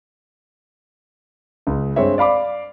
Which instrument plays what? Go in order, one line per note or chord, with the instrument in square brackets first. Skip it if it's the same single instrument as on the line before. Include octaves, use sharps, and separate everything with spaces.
[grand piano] C#2
G2 G#3 C4 C#5 E5
D5 F5 B5 D6